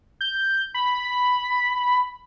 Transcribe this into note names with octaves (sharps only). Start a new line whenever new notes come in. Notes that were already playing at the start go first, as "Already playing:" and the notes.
G6
B5